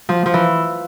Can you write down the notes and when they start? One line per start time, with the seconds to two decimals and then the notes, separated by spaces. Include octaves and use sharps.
0.09 F3
0.26 F3
0.34 E3